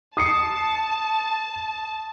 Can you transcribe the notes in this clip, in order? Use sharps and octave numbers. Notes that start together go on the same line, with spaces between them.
A5 D#6 C7 C#7